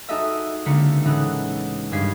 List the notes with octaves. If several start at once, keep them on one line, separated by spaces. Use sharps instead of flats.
D#4 F#4 G#4 A4 D#5 E5
C#2 D3 A#3 B6 C#7
A2 E3 C#4 D#4 A4 F#5
G#1 G2 G#3 G#6 B6 C7